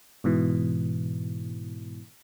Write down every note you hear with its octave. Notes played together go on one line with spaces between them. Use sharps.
G#2 B2 E3